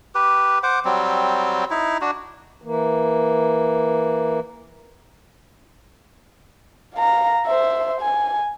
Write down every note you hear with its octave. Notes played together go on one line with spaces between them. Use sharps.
G4 B4
C5 F#5 D6
F#3 G3 C4
D#4 E4
D4 F#4
E3 A#3
F5 A#5
C5 E5
G#5